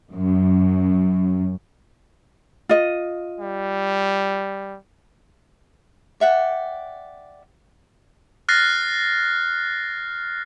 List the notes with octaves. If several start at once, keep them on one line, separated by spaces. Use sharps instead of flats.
F#2
F4 D#5
G3
D5 E5 F#5 G5
F6 F#6 A6 A#6 C7